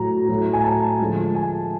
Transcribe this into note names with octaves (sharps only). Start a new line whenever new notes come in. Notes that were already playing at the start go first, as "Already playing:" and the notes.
Already playing: A2 F#3 A#5
A2 F#3
G#5
A5
D3 F3 G#3
G#5